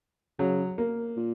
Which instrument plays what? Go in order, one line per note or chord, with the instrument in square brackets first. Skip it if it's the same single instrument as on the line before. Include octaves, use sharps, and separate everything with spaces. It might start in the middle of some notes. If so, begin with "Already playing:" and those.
[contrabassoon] C#3 [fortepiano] F#3
[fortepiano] A#3
[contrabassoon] A#2